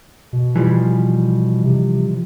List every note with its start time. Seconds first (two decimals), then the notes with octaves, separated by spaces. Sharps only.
0.33 B2
0.56 E3 F3 G3
1.64 C3